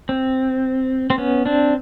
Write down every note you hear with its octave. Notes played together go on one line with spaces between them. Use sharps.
C4
C4
B3 C#4
C4 D4